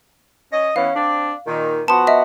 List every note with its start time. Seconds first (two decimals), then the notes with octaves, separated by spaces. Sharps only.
0.52 C#4 D#5
0.76 E3 B3 C#4 F5
0.95 C4 D4
1.47 A#2 D#3
1.88 F3 B3 F#4 A5 C6
2.07 D#5 E5